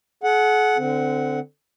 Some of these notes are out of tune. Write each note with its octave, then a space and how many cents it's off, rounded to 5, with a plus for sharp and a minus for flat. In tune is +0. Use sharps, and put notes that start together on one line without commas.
G#4 +45 F#5 +0
D3 +0 C4 -20 F#5 +0